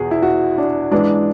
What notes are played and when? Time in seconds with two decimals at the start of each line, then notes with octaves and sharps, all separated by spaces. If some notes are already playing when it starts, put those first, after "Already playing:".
Already playing: E2 B2 G#4
0.11 E4
0.23 F#4
0.58 D4
0.91 G#2 E3 G#3 D4